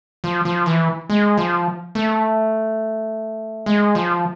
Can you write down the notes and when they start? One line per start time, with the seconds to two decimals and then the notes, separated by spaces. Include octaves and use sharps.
0.24 F3
0.45 F3
0.66 E3
1.09 G#3
1.38 F3
1.95 A3
3.66 G#3
3.95 F3